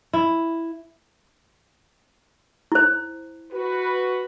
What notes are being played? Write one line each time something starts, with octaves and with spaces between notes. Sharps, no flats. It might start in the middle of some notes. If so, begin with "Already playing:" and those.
E4
E4 C5
F#4 B4